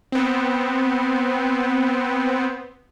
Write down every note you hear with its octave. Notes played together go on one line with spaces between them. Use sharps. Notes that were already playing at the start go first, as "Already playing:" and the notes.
B3 C4